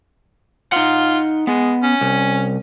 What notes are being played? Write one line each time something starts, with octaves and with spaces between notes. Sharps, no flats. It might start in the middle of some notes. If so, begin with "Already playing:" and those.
D#4 F4 F#5
G#3 B3
C#4
C2